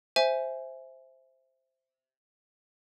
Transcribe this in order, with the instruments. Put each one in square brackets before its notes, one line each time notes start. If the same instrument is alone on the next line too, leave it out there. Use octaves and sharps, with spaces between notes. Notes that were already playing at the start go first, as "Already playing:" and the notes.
[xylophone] C5 E5 G#5